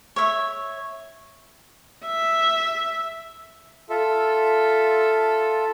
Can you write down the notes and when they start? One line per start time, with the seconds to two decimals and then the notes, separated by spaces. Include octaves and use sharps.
0.16 C#5 E5
2.06 E5
3.90 F4 A4 E5